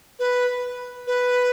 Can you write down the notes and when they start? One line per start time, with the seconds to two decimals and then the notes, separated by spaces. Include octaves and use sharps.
0.19 B4
1.07 B4